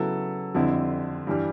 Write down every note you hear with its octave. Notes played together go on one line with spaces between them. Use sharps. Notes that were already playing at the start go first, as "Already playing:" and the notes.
Already playing: C#3 F#3 B3 E4 A4
F2 D3 G3 C4 E4
G2 E3 G3